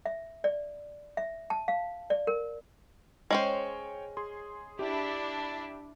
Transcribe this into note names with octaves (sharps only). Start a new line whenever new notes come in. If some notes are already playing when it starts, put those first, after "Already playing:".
E5
D5
E5
A5
F5
D5
A#4
G#3 C#4 C5 C#5 G5
G#4 C6
D4 E4 G4